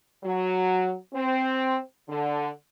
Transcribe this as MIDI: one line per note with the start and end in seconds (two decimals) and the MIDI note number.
0.24 0.94 54
1.13 1.77 60
2.08 2.47 50